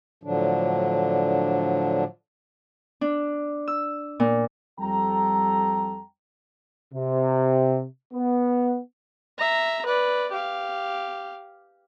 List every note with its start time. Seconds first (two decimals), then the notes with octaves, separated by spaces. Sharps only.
0.23 A2 D3 F3 F#3 D4
3.01 D4
3.68 E6
4.20 A#2
4.79 F2 G3 A4 G5 A#5
6.93 C3
8.14 B3
9.38 E5 A#5
9.86 B4 D5
10.31 G4 F5